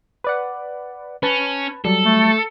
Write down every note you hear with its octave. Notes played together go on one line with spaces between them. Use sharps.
B4 D5 F#5
C#4 B4 A5
F#3 G3 A4
A3